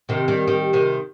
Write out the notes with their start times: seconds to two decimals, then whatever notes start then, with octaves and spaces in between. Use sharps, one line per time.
0.09 C3 D#3
0.28 D#3 G3
0.48 D#3 G3
0.73 C3 D#3